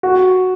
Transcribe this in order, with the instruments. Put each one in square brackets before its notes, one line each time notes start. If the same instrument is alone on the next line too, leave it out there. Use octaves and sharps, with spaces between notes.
[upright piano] F#4